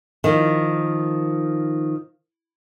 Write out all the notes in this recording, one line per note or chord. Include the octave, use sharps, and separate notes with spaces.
D#3 F3